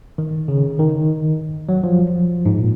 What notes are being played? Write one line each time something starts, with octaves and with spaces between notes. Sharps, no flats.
D#3
C#3
D#3
F#3
F3
G#2
A#2